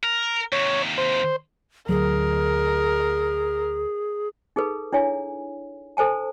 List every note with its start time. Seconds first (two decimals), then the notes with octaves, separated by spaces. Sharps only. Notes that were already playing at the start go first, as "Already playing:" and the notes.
0.03 A#4
0.52 D#2 C3 C#5
0.98 C5
1.89 D2 F#3 G#4 A#4
4.56 D#4 G#4 A4 B4
4.93 D4 E4 C#5 G#5
5.97 A4 C5 G#5 A5